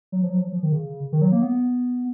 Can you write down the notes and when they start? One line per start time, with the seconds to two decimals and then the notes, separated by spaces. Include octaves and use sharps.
0.12 F#3
0.23 F3
0.30 F#3
0.38 F3
0.52 F3
0.63 D#3
0.72 C#3
1.12 D#3
1.22 F#3
1.32 A#3
1.42 B3